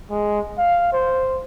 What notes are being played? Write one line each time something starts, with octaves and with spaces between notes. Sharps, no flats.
G#3
F5
C5